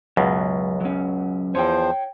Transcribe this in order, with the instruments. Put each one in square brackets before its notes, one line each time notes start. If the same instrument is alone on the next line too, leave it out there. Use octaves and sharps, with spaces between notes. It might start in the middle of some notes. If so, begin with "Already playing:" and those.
[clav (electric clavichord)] C#2 F#2 B2 [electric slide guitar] F#3
[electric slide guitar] F#3 C#4
[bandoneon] E2 F3 C5 [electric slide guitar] C#5 G5